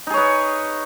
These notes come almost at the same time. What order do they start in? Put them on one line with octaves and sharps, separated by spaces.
D#4 G#4 C#5 B4